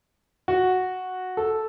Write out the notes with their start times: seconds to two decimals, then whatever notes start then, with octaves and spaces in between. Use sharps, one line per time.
0.48 F#4
1.37 A4